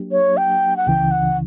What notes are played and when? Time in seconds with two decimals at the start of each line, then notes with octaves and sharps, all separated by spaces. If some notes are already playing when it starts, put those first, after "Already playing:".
Already playing: F#3 A#3 D4 G4
0.12 C#5
0.37 G5
0.77 F#5
0.87 C#2 C#3 E3 G5
1.11 F#5